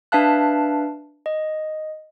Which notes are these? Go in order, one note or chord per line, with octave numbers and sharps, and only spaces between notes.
D4 B4 E5 F5 A5 F#6
D#5